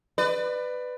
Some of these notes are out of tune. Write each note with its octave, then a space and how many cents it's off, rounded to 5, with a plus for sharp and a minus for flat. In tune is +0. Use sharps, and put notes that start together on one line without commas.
B4 +15 D5 +25